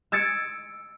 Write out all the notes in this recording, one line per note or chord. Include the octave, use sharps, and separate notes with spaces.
E6 G#6 A6 C#7 D7